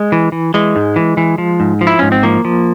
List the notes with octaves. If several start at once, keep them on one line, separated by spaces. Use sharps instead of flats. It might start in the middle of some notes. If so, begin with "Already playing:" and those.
Already playing: G#3
E3
E3
E3 G#3
G#2
E3
E3
F3
G#2
F3
E4
G#2 C#4
C4
F3 A#3
F3